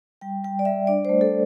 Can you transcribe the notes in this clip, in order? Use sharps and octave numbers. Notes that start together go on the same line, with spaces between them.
G3 G5
G3 G5
D5
G3 E5
D4 D5
C5
A3
A4